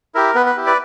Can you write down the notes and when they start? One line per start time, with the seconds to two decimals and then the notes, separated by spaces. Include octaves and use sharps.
0.14 E4 G4 A#4
0.35 B3 B4
0.46 B4
0.57 E4 G4
0.66 B4 D5